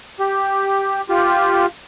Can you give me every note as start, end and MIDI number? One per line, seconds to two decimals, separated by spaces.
0.20 1.01 67
1.09 1.66 65
1.09 1.66 67